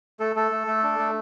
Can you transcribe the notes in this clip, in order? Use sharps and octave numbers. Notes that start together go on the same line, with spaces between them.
A3 A4
A3 A4
A3
A3
D4
A3